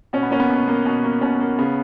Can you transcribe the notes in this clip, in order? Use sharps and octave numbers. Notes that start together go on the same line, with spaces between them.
B2 C#4
B3
A#3 C#4
B3
B2
A#3
B2
A#3
B2 C#4
A#3
C#3 B3